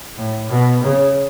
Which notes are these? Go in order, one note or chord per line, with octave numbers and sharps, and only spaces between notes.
A2
B2
C#3